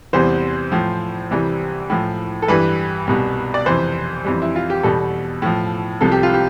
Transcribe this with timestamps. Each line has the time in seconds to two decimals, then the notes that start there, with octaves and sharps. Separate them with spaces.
0.13 E2 C3 E3 G3 C5
0.72 A2 F3
1.31 C2 C3 E3 G3
1.90 A2 F3
2.42 A4
2.48 G2 E3 G3 B4
3.07 C2 B2 G3
3.54 D5
3.66 F2 C3 E3 C5
4.25 F2 E3 G3
4.42 E4
4.56 F4
4.70 G4
4.83 E2 B2 G3 A4
5.42 A2 F3
6.01 C2 C3 F3 A4
6.12 G4
6.23 F4
6.34 G4